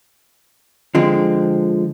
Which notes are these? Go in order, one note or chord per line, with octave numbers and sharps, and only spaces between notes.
D3 F3 G#3 C4